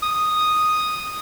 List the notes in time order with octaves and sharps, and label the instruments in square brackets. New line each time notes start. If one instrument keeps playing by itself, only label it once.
[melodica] D#6